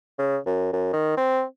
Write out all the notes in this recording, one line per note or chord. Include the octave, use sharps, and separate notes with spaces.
C#3
F#2
F#2
D#3
C4